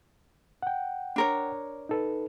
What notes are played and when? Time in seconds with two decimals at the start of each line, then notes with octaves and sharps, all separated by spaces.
0.62 F#5 G5
1.16 D4 A#4 C#5
1.89 D#4 A4 B4